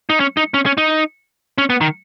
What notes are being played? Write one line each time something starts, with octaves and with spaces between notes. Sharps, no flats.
D#4
C#4
D#4
C#4
C#4
D#4
C#4
B3
D#3